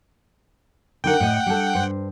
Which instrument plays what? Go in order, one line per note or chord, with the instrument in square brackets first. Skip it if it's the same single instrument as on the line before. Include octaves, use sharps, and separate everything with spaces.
[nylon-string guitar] D3 D#4 A#4 [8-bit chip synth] F#5 G5
[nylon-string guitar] A2 D#5
G3 D4 A4
G2 C5